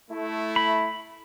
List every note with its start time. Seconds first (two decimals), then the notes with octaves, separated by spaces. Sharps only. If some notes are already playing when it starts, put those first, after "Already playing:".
0.11 A3 E4
0.56 B5